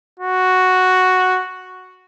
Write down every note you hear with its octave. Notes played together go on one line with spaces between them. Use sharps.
F#4